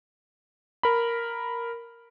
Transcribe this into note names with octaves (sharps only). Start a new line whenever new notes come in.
A#4 B5